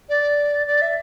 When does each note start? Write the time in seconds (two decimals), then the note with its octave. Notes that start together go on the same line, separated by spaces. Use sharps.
0.09 D5
0.67 D5
0.82 E5